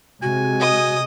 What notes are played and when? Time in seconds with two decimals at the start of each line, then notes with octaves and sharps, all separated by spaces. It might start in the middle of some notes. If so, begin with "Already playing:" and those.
0.22 C3 G#3 F#4 G#5
0.59 D#5 D#6